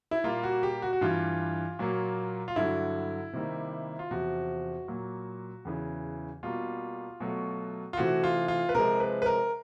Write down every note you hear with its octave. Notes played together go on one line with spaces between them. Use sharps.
E4
A#2 G3 A#3 F4
F#4
G4
F#4
F#4
G2 E3 G3 F4
A#2 F#3 A#3
F4
G2 D3 F#3 E4
C3 D#3 G3 A#3
F4
E2 C3 F3 F#4
A#2 F#3 A#3
E2 C#3 E3
B2 G3 A#3 F4
B2 F#3 A3
F4
C3 E3 A3 F#4
F4
F4
B4
C3 F3 G#3 A#4
B4
B4
A#4